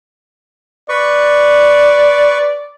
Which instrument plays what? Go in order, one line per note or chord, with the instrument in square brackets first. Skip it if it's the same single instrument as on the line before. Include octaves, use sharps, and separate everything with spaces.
[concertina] B4 C#6 [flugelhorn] D5